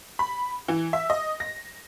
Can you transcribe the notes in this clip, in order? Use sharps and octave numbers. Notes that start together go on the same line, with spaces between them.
B5
E3
E5
D#5
A#6